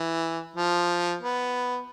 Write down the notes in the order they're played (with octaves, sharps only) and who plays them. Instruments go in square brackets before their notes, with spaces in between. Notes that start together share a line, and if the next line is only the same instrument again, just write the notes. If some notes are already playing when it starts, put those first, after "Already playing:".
Already playing: [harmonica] E3
F3
B3